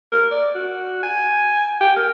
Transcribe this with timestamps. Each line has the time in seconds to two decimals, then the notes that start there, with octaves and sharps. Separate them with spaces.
0.12 A#4
0.31 D5
0.55 F#4
1.03 G#5
1.81 G5
1.96 A#4